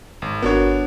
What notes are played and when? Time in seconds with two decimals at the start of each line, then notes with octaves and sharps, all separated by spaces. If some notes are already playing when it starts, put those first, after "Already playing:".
0.22 G#1
0.42 G1 B3 D4 F#4 A#4 C#5